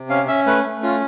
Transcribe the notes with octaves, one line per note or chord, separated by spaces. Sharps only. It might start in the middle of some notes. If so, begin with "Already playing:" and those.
Already playing: C3
C#4 F5
C#4 E5
A3 B4
A3
C#4 F4